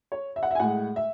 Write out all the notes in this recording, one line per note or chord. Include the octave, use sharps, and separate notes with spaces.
C#5
E5
F#5
E5
G#5
A2 G#3 F#5
E5